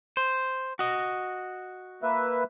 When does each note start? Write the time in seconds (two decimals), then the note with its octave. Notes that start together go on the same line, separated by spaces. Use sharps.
0.17 C5
0.79 F#4 D#5
2.03 A#3 B4 E5